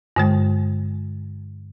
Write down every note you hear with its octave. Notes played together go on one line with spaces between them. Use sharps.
G2 D3 G#3